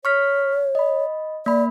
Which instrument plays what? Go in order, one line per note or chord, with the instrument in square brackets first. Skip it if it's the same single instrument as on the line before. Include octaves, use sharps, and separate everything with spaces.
[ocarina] C#5 [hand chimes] C#6 F6 B6
[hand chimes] D#5 B5
[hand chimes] A#3 B5 [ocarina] D5